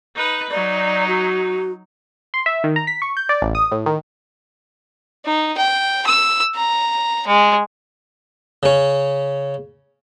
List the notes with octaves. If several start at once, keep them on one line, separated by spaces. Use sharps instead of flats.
D#4 B4
F#3 D#4 D5
F#4
C6
E5
D#3
A#5
B6
C#6
G6
D5
A1
D#6
A2
D#3
D#4
G5
E6
A#5
G#3
C#3 C#4